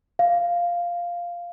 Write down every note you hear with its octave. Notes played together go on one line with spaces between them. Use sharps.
F5